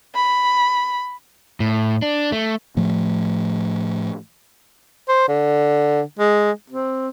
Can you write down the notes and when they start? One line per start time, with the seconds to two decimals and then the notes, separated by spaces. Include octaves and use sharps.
0.15 B5
1.60 A2
2.02 D4
2.32 A3
2.77 A2 F3 A3
5.08 C5
5.28 D3
6.19 G#3
6.70 C4